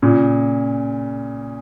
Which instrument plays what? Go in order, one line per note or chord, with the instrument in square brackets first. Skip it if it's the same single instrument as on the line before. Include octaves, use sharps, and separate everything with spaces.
[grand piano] A#2 C#3